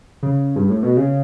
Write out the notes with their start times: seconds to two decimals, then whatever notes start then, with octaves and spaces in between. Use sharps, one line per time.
0.23 C#3
0.56 G2
0.70 A2
0.83 B2
0.97 C#3